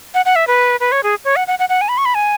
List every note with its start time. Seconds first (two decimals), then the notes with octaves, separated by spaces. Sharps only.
0.14 F#5
0.26 F#5
0.36 E5
0.47 B4
0.80 B4
0.92 C#5
1.03 G#4
1.25 C#5
1.36 F#5
1.48 F#5
1.59 F#5
1.69 F#5
1.81 G#5
1.89 B5
1.98 C#6
2.05 B5
2.15 G#5